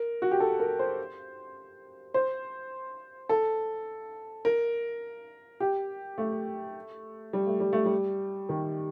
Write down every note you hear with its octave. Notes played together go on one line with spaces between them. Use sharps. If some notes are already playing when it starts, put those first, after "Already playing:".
Already playing: A#4
F#4
G4
A4
A#4
C5
C5
A4
A#4
G4
A3
G3
A3
G3
A3
G3
D#3